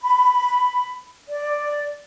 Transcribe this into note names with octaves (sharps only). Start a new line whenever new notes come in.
B5
D5